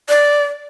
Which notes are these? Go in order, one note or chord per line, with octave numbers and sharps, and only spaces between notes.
D5